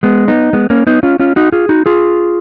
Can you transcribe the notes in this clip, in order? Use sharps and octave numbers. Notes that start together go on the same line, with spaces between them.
G#3 B3
B3 D#4
G#3 B3
A#3 C#4
B3 D#4
C#4 F4
C#4 F4
D#4 F#4
F4 G#4
D#4 F#4
F4 G#4